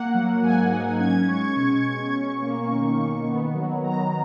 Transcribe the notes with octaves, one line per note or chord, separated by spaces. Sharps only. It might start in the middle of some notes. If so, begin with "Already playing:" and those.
Already playing: A#3 F#5
F#3
G#2 G#5
D#4
C#4 G#6
G#3 C#6
B2 C#6
B2
C#4
A#3
D#3
D#3
B3
F#3
D#3 A#5